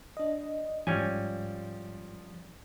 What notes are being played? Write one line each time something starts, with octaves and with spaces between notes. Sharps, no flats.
D4 D#5
G#2 F3 G3 C#4 G#5